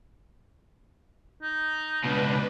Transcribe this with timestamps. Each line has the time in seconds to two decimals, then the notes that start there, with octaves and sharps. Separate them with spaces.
1.42 D#4
2.04 C#2 B2 D4 B4